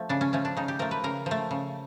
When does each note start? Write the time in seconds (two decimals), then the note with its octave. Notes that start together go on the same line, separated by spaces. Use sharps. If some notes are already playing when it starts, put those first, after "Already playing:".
Already playing: F3 A3
0.09 C#3 D4
0.21 C#4
0.33 F3 A3 C#4
0.45 D4
0.57 C#3 D#4
0.68 G4
0.79 F3 A3 A#4
0.91 B4
1.04 C#3 A#4
1.26 F3 A3
1.51 C#3